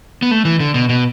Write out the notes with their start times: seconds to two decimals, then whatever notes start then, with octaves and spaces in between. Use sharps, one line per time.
0.22 B3
0.31 A3
0.45 E3
0.60 D3
0.74 B2
0.89 B2